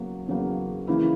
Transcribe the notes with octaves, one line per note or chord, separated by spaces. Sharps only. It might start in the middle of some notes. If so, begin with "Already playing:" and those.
Already playing: E2 C#3 F#3 A#3
E2 C#3 F#3 A#3
C#3 E3 A#3 E4